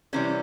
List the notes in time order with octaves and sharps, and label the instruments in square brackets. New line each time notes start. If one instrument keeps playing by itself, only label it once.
[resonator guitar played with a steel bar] C3 E3 G3 C#4